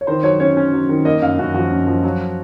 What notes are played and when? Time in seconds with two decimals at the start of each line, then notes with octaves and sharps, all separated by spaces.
0.01 C#5
0.07 D#3 C5
0.23 F#3 C#5
0.40 C#4 C#5
0.57 C#4
0.73 F#3
0.89 D#3
1.05 A#3 D#5
1.22 F#2 F5
1.39 F#2 F#4
1.54 F3 F#4
1.72 F#2
1.87 F3
2.03 F#3